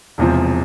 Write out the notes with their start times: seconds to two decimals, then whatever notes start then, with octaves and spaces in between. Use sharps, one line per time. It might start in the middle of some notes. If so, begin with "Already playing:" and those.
0.18 E1 E2 C3 F3